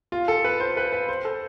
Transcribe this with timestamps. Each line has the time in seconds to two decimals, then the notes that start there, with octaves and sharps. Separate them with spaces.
0.12 F4
0.28 A4
0.44 B4
0.60 C5
0.77 B4
0.93 B4
1.09 C5
1.25 A4